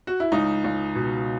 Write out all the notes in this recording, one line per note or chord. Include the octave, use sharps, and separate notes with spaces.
F#4
E4
C#2 D#4
C#2
B2